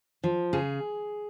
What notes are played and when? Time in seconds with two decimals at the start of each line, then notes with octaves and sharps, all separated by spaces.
0.24 F3
0.53 C#3 G#4